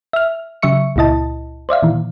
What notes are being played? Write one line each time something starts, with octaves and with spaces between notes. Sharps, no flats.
E5 F6
C#3 F#3 E5 C#6 C#7
C#2 A#2 E4 D#5 A5
C5 D5 E5 F5
A#2 D#3 E3